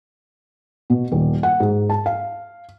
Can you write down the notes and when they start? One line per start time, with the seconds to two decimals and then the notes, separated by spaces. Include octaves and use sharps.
0.90 B2
1.12 D#1
1.43 F#5
1.60 G#2
1.89 A5
2.06 F5